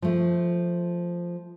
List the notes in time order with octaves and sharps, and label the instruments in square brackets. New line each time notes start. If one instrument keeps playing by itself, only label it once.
[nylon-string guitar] F3 A3